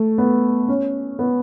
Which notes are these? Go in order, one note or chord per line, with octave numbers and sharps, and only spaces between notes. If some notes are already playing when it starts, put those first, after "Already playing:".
Already playing: A3
B3
C#4
B3